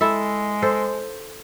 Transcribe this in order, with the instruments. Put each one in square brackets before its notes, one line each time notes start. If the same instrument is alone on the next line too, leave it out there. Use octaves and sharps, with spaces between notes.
[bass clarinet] G#3 [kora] E4 A4 E5
[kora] A4 C5